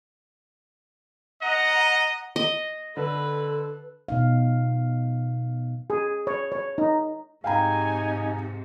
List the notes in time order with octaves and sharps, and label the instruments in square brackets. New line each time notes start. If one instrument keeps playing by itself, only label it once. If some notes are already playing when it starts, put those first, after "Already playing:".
[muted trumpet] D#5 [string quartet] F#5 A#5
[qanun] D#5
[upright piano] D3 [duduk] A4 [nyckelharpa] B4
[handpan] B2 D#4 F5
[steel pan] G#4
C#5
C#5
D#4
[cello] G#2 C3 [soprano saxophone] D#4 [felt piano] F5 G5 A#5 [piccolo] G#5